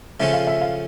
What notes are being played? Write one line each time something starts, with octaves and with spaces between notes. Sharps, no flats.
C#3 F3 A3 C#4 F4 E5
F5
E5
F5